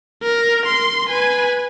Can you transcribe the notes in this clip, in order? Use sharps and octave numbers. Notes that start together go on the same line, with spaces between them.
A#4
C6
B4 G#5